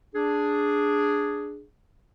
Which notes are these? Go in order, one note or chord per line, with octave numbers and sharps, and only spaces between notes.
D4 G#4